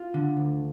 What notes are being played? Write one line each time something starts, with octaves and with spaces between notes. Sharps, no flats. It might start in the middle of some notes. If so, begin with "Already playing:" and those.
Already playing: F4
D3
D2